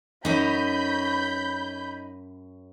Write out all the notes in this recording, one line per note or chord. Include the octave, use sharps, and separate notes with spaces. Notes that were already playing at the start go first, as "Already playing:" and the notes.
F#2 C#4 D#4 B5 G6